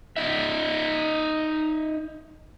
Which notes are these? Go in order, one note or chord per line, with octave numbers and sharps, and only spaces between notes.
D#4 E5